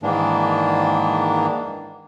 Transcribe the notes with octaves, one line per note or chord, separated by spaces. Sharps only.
G#2 D#3 E3 A#3 D4